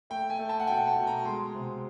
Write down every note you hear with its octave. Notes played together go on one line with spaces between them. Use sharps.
A3 G5
G#5
A3
A5
F#5
B2 G5
A5
B2
A#5
G#3 C6
C3